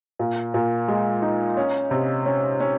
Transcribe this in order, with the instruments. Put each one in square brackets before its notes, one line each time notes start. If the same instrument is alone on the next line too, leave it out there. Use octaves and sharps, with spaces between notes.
[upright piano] A#2
A#2
G#3
D#4
C#4
C3
C#4
C#4